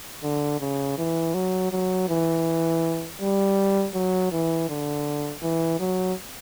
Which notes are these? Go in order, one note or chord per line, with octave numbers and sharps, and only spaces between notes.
D3
C#3
E3
F#3
F#3
E3
G3
F#3
E3
D3
E3
F#3